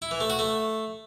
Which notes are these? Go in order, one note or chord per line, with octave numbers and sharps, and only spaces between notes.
E4
E3
A3
F#4
A3